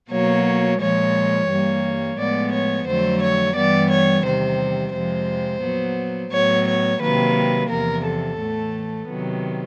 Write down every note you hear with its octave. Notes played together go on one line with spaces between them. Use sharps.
B2 F#3 A#3 C#5
A#2 F3 G#3 C#5
G2 E3 G3 A#3
A2 F3 G#3 B3 D5
C#5
F2 D3 F#3 A3 C5
C#5
G2 E3 G3 B3 D5
C#5
E2 C3 D#3 G3 C5
F2 C3 F3 G#3 C5
A#2 F#3 B3
A2 F#3 B3 C#5
C#5
C3 D#3 F#3 A#3 B4
E2 C3 F3 A#4
A4
A2 E3 A3
C3 D#3 F#3 B3